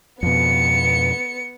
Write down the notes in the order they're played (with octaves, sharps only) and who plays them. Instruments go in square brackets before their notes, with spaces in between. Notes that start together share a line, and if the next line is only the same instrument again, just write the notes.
[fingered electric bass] F2 B2 [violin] B3 C#7